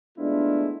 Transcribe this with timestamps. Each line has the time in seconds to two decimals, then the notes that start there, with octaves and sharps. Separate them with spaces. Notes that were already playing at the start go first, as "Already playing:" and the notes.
0.17 G#3 A3 B3 D4 E4 F4